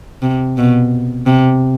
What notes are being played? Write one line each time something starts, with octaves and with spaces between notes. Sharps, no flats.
C3
B2
C3